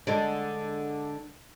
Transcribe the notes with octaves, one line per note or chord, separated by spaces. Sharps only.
D3 G#3 D4